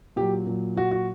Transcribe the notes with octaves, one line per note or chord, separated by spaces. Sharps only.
A#2 F#3 G4
A#2 F#3
A#2 F#3 F#4
F#4